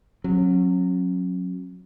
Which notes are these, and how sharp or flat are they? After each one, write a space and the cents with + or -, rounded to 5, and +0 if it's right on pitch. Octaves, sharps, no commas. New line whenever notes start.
F#3 -20 C#4 -35